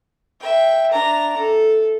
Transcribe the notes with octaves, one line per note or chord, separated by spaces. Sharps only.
E5 G5
D4 A#5
A4